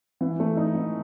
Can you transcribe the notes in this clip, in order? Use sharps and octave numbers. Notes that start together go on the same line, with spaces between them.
E3
A3
D#4
E3